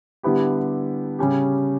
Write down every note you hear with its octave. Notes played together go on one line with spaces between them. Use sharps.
D3 G3 B3 E4 G4
C#3 G3 C#4 G4